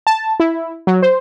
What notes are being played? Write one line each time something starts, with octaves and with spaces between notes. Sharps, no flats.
A5
E4
F#3
C5